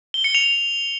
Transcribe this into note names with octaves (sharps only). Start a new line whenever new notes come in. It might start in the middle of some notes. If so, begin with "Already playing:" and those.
G7
C#7
F7